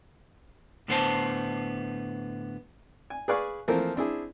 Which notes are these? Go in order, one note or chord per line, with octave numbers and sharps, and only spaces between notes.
A2 D3 B3 E4 C5 A5
G#5
G#4 B4 D5 F5 G#5 C#6
E3 F3 A3 A#3 C4 A#4
C4 D4 E4 G#4